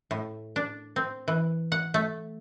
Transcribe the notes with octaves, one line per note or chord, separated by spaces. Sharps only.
A2
D4
C4
E3
F#5
A3